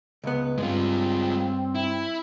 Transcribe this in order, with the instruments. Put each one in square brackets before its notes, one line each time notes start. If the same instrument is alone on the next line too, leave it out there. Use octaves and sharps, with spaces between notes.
[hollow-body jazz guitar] C#2 B3
[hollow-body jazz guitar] G2 [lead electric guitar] G#3 F4 [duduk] C4
[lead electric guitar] E4